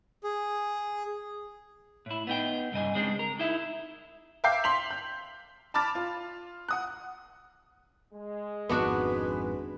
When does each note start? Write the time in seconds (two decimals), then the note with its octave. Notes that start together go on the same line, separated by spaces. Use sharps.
0.24 G#4
2.06 A2 E4
2.27 B3 D#4 G5
2.72 C2 G2 C#3 D#5 G#5
2.94 C#3 G#3 C4 D4
3.19 A#4
3.39 D#4 E4 E5
4.44 E5 F5 G5 D6 G6 C7
4.64 C6 B6 F7 F#7
4.91 G6
5.74 A5 B5 D6 F6 A6
5.95 F4
6.69 F#5 D#6 F#6
8.14 G#3
8.69 G#1 F2 G#2 B3 D4 F#4 B4